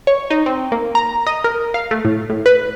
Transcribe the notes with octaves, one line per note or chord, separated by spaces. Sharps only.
C#5
D#4
C4
A#3
A#5
D#5
A#4
F5
A3
A2
A2
B4